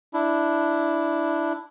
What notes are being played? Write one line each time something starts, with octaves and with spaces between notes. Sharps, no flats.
D4 E4